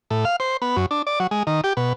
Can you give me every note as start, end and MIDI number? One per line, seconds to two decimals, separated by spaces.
0.11 0.25 45
0.25 0.36 77
0.40 0.57 72
0.62 0.76 59
0.76 0.86 42
0.91 1.02 62
1.07 1.19 74
1.20 1.27 54
1.31 1.43 56
1.47 1.61 51
1.64 1.73 67
1.77 1.93 47